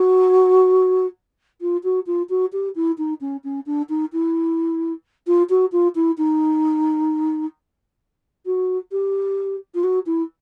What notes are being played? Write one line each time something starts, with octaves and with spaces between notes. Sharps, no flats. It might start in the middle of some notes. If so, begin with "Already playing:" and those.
Already playing: F#4
F4
F#4
F4
F#4
G4
E4
D#4
C#4
C#4
D4
D#4
E4
F4
F#4
F4
E4
D#4
F#4
G4
F4
F#4
E4